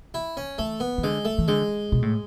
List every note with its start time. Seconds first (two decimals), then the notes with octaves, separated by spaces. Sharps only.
0.14 E4
0.37 C#4
0.58 E3 A3
0.80 B3
0.98 E3
1.03 D3 G#3
1.25 A3
1.38 E3
1.48 D3 G#3
1.92 B2
2.02 A2